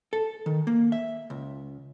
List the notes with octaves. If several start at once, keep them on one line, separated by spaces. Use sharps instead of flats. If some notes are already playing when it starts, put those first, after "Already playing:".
A4
D#3
A#3
E5
C#2